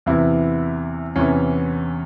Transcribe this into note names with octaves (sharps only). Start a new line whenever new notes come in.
E2 C3 E3 E4
E2 C3 E3 C#4